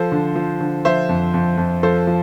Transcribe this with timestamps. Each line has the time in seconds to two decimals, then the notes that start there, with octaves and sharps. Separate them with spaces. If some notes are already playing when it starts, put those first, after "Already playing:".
Already playing: F3 A4 C5
0.12 D3
0.35 F3
0.60 D3
0.85 F3 C5 E5
1.09 F2
1.34 F2
1.57 F2
1.83 F3 A4 C5
2.07 F3